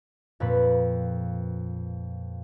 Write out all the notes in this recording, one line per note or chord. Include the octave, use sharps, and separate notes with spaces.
F2 A#2 B4